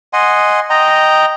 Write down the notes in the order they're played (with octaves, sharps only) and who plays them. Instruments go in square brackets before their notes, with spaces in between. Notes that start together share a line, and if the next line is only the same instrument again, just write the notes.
[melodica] D#5 F#5 G#5 C6
D#5 G5 A#5